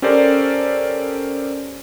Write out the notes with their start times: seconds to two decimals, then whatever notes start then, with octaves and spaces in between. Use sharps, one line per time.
0.02 C#4 G4 A4 A#4 C5 D5